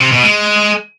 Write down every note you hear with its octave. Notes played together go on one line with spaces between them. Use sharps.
C3
B2
G#3